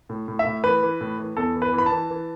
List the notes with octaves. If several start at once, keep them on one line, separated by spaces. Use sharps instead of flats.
A2
A2
E5
A2
E3 B4
E3
A2
E3
E2 A4
E3
B4
E3
B5
A5
E3
E3